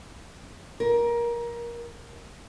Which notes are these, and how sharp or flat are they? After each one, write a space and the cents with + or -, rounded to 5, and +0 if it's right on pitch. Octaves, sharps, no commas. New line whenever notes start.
A#4 +20